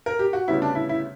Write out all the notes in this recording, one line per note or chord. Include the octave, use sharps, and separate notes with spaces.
A#4
G4
F#4
D2 C#3 G3 B3 E4
D4
E4
E4